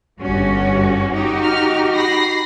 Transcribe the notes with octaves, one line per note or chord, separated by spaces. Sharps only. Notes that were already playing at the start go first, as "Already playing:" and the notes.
G1 G2 C#4 F#4
D#4 F#4 G4
F6
B5 A#6 C7